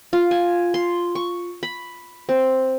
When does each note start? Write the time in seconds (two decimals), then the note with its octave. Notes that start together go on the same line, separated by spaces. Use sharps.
0.13 F4
0.31 G#5
0.74 C6
1.15 C#6
1.63 B5
2.29 C4